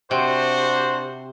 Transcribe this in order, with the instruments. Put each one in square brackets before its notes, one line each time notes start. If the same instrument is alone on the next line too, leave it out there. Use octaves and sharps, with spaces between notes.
[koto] C3 [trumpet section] D4 F#4 C5